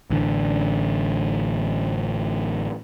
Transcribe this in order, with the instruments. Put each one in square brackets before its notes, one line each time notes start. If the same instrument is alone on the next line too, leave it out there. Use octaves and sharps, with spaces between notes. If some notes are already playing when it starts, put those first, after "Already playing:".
[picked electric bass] A1 D3